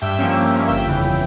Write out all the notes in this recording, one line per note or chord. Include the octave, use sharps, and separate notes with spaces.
G2 E5 G5
F3 A#3 C#4
G2
F3 A#3 C#4
G1 E5 G5
F2 C#3 E3